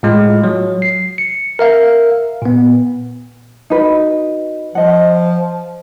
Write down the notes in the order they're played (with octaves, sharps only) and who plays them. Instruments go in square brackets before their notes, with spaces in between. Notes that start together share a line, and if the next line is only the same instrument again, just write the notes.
[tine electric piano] A2 G#3 F4
F#3
C7
C#7
A#4 E5 F5
A#2 B3
[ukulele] D#4 F#4 B4
[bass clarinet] F3 [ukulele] D#5 F#5